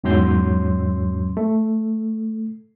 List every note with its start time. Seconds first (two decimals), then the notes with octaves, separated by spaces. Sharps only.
0.04 E2 G#2 F#3 C#4 C6 G6
1.37 A3